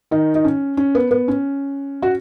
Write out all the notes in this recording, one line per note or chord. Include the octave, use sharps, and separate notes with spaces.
D#3 D#4
D#4
C#4
C#4
B3
B3
C#4
F#4